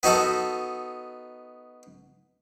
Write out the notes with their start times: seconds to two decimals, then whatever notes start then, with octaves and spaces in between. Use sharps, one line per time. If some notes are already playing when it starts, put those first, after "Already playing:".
0.03 B3 D#4 F#4 A4